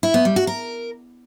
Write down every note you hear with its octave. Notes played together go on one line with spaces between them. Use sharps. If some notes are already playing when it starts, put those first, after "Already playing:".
E4
B3
G3
F#4
A#4